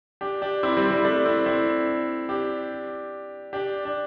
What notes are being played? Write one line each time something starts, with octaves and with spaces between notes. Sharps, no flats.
D4 G4
D4 G4
C4 E4
G3 C4
G3 C4
A3 D4
C4 E4
C4 E4
D4 G4
D4 G4
D4